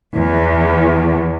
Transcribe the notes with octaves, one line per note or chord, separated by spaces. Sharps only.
E2